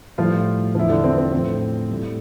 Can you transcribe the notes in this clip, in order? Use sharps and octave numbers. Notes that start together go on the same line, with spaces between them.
A2 F3 G3 F4
E2 D3 F3 E4
D3 D4
C4
C4
A2 F3 C4
A2 G3